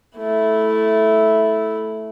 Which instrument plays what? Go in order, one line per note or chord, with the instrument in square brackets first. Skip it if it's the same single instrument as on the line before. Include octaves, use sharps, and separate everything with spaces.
[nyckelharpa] A3 E4